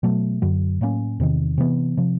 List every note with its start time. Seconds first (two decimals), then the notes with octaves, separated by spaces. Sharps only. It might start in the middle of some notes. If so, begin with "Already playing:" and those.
0.03 B2 F#3 A3
0.42 F#2 D3 F#3
0.81 A2 F#3 A#3 C#4
1.20 E2 C3 D#3
1.58 C3 E3 G#3 B3
1.97 C3 F3